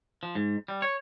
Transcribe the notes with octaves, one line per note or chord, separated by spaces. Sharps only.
F3
G#2
G3
C#5